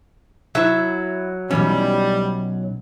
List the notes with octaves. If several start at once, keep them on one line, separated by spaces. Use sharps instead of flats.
F#3 E4 E5
B1 F2 E3 G3 C#4